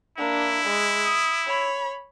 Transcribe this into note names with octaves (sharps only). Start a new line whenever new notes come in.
A#3 D4 E4
G#3
D#6
C#5 B5